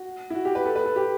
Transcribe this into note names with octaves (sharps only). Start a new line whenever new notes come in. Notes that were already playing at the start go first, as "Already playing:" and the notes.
Already playing: F#4
E4
F#4
G4
B4
A4
B4
A4
G4